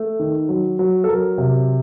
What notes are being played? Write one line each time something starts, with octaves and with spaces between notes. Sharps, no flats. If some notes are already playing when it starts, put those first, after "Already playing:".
Already playing: A3
D#3
F#3
F#3
A4
F#3 A#4
C3